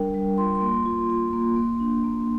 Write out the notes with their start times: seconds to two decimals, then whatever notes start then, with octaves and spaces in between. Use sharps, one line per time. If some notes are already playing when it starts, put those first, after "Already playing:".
Already playing: G3 D4 A#4 G5
0.14 G3
0.38 F4 C6
0.55 C6
0.61 A#3
0.86 F4
1.10 F4
1.33 A#3
1.56 A#3
1.80 D4
2.04 A#3